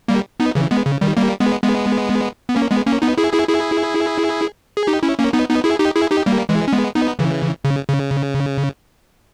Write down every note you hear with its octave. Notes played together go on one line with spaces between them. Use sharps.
G3 A#3
B3 D#4
C#3 E3
G#3 B3
C#3
D#3 G3
G3 A#3
G#3 B3
G#3 B3
B3
A#3 C#4
G#3 B3
A#3 C#4
B3 D#4
E4 G#4
E4 G#4
E4 G#4
G#4
D#4 G4
C#4 E4
A#3 C#4
B3 D#4
B3 D#4
E4 G#4
D#4 G4
E4 G#4
D#4 G4
G3 A#3
E3 G#3
C#4
G#3 B3
B3 D#4
C#3 E3
C#3
C#3